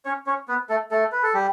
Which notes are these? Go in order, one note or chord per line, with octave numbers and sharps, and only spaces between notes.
C#4 C#5
C#4 C#5
B3 B4
A3 A4
A3 A4
B4
A4
G3 G4